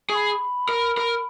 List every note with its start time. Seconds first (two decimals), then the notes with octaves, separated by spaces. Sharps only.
0.10 G#4 C#6
0.15 B5
0.69 A#4
0.97 A#4